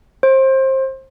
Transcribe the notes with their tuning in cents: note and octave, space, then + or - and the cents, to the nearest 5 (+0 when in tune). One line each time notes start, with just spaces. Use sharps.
C5 +25